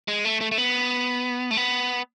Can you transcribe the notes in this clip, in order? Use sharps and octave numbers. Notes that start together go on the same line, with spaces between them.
G#3
A3
A3
A3
B3
A3
B3